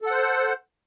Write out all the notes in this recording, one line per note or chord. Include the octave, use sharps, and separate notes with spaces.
A4 C5 F#5